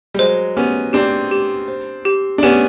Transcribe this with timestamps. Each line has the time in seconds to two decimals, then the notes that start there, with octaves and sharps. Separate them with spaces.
0.14 G3
0.19 F#3 G#3 C5
0.57 B3 C#4 G4
0.93 C4 D4 G4
1.31 G4
1.68 C5
2.05 G4
2.38 D4
2.43 B3 C#4 G4